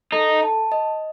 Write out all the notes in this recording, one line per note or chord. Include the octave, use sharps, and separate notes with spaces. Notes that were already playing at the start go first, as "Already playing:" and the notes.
D#4 A4
A5
D#5